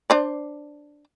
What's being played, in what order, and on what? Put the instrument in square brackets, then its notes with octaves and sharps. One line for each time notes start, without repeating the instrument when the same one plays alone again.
[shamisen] D4 C5 D5